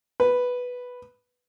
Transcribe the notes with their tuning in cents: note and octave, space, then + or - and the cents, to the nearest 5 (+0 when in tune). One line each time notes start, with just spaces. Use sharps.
B4 +0